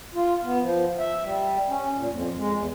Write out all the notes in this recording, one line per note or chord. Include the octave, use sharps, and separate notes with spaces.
F4
B3
F3
E5
G3
C#4
A#2
F2
G#3
E2